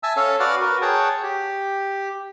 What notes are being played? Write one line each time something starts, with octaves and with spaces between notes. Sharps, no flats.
E5 G#5 A5 E6
C#4 A4 C#5 F5 A5
F#4 B4 D5 F5 F#5 F6
F#4 A#4 B4
G#4 C#5 F#5 G5 A5
G4